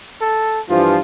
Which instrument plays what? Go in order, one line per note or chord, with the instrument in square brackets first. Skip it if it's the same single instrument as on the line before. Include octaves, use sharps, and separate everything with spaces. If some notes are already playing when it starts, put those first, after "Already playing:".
[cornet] A4
[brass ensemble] G2 E3 F3 [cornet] F4